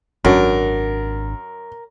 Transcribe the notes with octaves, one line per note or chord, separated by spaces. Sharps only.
G#1 F#2 C#4 D4 A#4